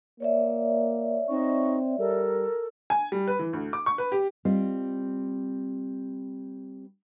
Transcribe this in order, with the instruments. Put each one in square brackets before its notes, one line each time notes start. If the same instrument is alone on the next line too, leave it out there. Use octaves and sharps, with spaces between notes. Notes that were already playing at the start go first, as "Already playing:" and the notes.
[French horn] A#3 [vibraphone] C#5 D5 E5
[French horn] C4 [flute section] D#4 C#6
[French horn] G3 [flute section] A4 A#4
[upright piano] G#5
G3
B4
E3
D2
D6
C#6
B4
G4
[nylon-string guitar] G3 C4 F4 C5 D#5